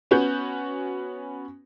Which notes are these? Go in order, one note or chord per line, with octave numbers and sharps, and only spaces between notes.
B3 C#4 F#4 G6